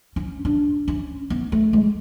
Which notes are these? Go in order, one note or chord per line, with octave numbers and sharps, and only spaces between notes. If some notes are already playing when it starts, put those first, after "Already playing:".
C#4
D4
C#4
B3
A3
G#3